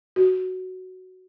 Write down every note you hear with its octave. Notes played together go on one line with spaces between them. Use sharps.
F#4